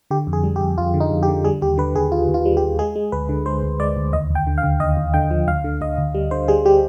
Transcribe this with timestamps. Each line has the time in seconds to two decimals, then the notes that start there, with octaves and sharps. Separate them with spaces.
0.10 D3 G4
0.27 F2
0.33 G#4
0.44 G3
0.56 G4
0.61 F2
0.78 F2 F4
0.94 D3
1.00 D#4
1.11 F2
1.23 G4
1.28 D3
1.44 G3 G#4
1.62 D#2 G4
1.78 D3 B4
1.95 D#2 G#4
2.12 D#2 F4
2.28 D#2
2.34 F4
2.45 G3
2.57 G4
2.63 D#2
2.79 G#3 G#4
2.96 G#3
3.12 D2 B4
3.29 D3
3.46 G#3 C5
3.63 D2
3.80 G#3 D5
3.97 D2
4.13 D#2 D#5
4.30 D#2
4.35 G5
4.47 D3
4.58 F5
4.63 D3
4.80 D#2 D#5
4.97 D#2
5.14 D3 G5
5.31 F3
5.48 D2 F5
5.64 D3
5.81 D2 D#5
5.98 D2
6.15 G3
6.31 D3 C5
6.48 G3 G#4
6.65 G3 G4